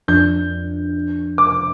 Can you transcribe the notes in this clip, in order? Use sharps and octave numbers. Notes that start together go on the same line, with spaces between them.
F2 F3 D4 G6
D6